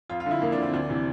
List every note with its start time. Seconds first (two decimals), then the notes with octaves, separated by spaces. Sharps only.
0.09 F2 F4
0.20 F4
0.26 D3
0.31 E4
0.41 F2 A#3
0.52 D4
0.57 D3
0.63 C4
0.73 D2 D4
0.89 C3 E3